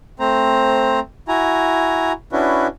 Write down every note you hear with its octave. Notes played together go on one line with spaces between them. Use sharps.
A3 C4 C5 A#5
E4 F#4 G#5 A#5
C#4 D4 E4 F#4 B4